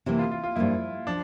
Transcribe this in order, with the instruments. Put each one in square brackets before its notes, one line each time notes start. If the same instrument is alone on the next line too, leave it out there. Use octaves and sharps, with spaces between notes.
[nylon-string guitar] C3 E3 A#3 [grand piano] E4
[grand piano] F4
F4
F4
[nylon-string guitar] G2 F3 A#3 [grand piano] E4
[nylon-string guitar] F3 [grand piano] D4